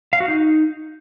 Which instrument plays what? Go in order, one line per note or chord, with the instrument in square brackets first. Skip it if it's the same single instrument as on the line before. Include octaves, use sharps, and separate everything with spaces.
[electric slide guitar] F5
F#4
D#4